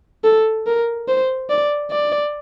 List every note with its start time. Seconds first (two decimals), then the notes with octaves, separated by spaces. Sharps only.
0.24 A4
0.67 A#4
1.09 C5
1.50 D5
1.92 D5